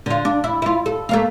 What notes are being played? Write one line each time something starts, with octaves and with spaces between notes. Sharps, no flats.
D3 F4
D4
E4
E4 F4
A4
A3 A#3 F5